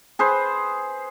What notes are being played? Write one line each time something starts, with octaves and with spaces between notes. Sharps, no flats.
G#4 B4 C5